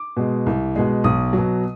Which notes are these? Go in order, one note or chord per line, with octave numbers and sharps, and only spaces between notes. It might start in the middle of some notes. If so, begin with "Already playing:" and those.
Already playing: D6
B2 G#3
C2
B2 G#3
B1 D#6
B2 F#3